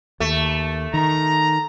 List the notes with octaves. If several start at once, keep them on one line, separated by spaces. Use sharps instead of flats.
D#2 A3
D#3 A#5